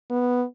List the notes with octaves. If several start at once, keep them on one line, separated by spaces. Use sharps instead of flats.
B3